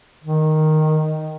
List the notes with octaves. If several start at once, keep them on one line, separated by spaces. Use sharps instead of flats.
D#3